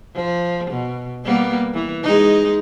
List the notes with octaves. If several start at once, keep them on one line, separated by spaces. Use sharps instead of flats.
F3
B2
G3 A#3 B3
E3
G#3 D#4